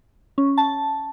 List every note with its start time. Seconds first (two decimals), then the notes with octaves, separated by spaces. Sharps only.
0.38 C#4
0.58 A5